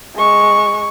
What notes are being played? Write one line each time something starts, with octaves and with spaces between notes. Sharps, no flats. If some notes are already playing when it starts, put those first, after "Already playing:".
G#3 C#6